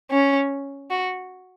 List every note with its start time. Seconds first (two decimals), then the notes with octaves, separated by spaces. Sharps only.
0.11 C#4
0.90 F#4